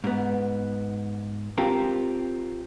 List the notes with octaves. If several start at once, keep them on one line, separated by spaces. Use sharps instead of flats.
G#2 B3
C4 F4 G4 A#4